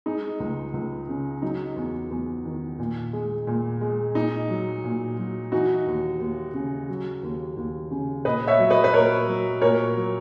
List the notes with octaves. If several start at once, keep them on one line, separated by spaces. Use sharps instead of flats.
G#3 D#4
C#2
C#2
C#3
F#3 D#4
E2
E2
D#3
A#2
G#3
A#2
G#3
A#2 D#4
F#3
A#2
F#3
E3 D#4 F#4
D#2
D#2
C#3
F#3
D#2
D#2
C#3
A#2 B4 D#5
C#5 E5
F#3
B4 D#5
B4
A#2 A#4 C#5
F#3
A#2 A#4 C#5
F#3